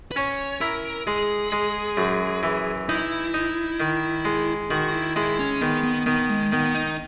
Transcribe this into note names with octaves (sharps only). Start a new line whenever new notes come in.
B4
C#4 C#5
E4 A#4
G#3 G#4
G#3
F#2
E3
D#4 E4
D#4
D#3
G#3
D#3 F#4
E4
G#3 E4
C#4
D#3 B3
B3
D#3 B3
G#3
D#3 B3
D#4